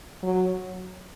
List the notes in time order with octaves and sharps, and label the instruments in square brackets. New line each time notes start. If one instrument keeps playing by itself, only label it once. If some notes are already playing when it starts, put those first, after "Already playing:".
[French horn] F#3